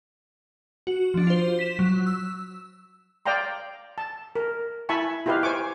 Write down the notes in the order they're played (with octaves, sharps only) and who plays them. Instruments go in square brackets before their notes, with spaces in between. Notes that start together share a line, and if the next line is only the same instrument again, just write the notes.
[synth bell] F#4
F3 D4
F4 C5
B6 E7
F#3
E6
[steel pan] D5 F5 G5 A#5 C6
A5
A#4
E4 E5 G#5 A5 B5 C#6
E4 F4 G4 B4 D#5 F5
C5 G#5 C#6 D6